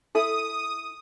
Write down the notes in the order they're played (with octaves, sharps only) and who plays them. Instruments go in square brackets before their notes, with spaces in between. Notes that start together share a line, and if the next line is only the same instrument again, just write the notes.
[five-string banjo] E4 A4 [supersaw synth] D#6